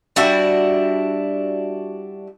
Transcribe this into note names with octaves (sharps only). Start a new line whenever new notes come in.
G3 D4 E4 F#4